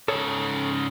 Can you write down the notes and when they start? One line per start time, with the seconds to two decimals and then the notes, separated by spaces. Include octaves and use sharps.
0.08 G#2 C#3 A4 C#5